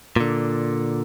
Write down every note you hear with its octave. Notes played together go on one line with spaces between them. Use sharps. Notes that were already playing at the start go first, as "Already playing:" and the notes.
A#2 D3